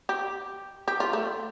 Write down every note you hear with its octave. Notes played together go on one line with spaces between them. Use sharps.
G4
G4
F4
A3